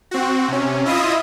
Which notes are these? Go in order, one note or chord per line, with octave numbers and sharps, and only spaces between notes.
C4 F#4
C3 C#4
E4 F4 D#5 E5 D#6